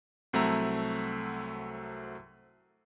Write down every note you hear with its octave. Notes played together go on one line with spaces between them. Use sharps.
C2 F#3 A3 C4 E5 A#5